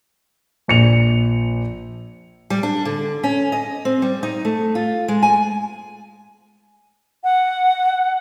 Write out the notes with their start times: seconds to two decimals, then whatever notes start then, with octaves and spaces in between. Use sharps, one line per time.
0.68 A#1 C#7 F7
2.50 G3
2.63 D4
2.85 D3
3.23 C#4
3.52 D#5
3.85 C4
4.02 G3
4.23 D#4
4.45 A3
4.75 F4
5.08 G#3
5.23 G#5
7.24 F#5